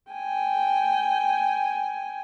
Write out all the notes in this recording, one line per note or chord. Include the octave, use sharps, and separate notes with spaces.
G5 G#5